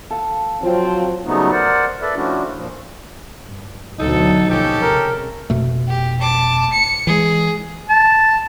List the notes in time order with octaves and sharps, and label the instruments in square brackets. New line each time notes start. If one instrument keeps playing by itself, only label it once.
[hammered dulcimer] A4 F5
[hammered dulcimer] F3 [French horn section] F#3 C4 F4
[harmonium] C#3 F#3 G3 A3 B3 D#4
A#4 C5 D5 F#5
A4 B4 D5 E5
F3 A3 C#4 D4 E4 F#4
A#2 F3
[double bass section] G2
[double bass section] D2 B2 F#3 [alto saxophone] D#4 [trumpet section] A4
[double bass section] A#1 F3 [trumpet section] C#4 G4 A4
[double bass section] C2 C#3 [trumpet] A#4
[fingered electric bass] F1 B2 A3
[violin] G4
A5 D6
C#7
[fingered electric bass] E3 G#3 [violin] G#4
[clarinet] A5